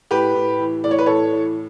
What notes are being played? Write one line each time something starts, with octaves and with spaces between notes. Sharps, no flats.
A2 G4 B4
A2
E3
A2 D5
C#5
B4
A2 A4 C#5
E3